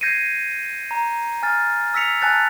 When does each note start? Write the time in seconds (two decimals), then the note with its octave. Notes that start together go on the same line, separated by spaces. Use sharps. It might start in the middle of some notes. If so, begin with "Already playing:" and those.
0.01 G6 G#6 A#6 C7 C#7 D#7
0.91 A#5
1.43 G#5 F6 A6
1.94 E6 A#6 B6 C#7 F7
2.22 G#5 A5 F#6 A6